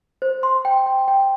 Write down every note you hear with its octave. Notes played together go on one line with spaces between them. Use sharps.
C5
C6
G5
G5
G5